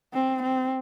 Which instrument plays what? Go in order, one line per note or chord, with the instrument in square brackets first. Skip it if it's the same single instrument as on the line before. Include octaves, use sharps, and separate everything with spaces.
[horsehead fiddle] C4
C4